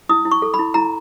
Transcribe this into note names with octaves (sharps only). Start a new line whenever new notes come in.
E4 D#6
E4
C#6
A4
B5
E4
E4 A#5